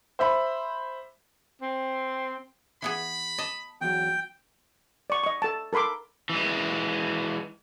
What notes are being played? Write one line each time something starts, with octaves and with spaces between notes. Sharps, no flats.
C5 E5 B5
C4
E3 B3 G#4 B5
D#5 A5
E2 F#3 G5
D5 C#6
D#5 C#6
A4 A5
A4 A#4 B5 C6 D6
E3 G#3